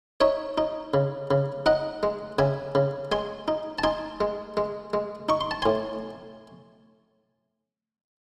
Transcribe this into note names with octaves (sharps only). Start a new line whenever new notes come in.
D#4 C#5 E5
D#4
C#3
C#3
D#4 D#5 F#5
G#3
C#3 E5 G#5
C#3
G#3 G#5 C6
D#4
A5
D#4 G#5 C6
G#3
G#3
G#3
D#4 C#6
C6
A5
A2 G#5 C6